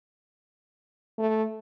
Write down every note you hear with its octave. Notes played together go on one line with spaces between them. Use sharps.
A3